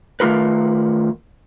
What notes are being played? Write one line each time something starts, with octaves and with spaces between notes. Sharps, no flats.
D#3 A3 A#3 F4 A#4 B4